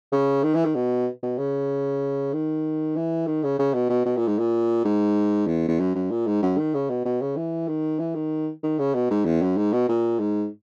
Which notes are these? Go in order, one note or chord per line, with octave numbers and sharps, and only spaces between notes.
C#3
D#3
E3
D#3
B2
B2
C#3
D#3
E3
D#3
C#3
C#3
B2
B2
B2
A#2
G#2
A#2
G#2
E2
E2
F#2
F#2
A#2
G#2
F#2
D#3
C#3
B2
B2
C#3
E3
D#3
E3
D#3
D#3
C#3
B2
G#2
E2
F#2
G#2
B2
A#2
G#2